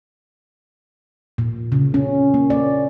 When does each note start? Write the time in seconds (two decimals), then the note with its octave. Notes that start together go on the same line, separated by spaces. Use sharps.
1.38 A#2
1.72 C#3
1.94 C#4
2.34 A#3
2.50 D5